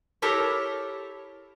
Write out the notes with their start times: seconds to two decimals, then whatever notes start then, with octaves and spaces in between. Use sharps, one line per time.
0.22 E4 G4 A4 A#4 C#5